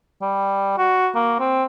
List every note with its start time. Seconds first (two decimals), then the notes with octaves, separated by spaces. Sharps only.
0.22 G3
0.78 F#4
1.15 A#3
1.39 C4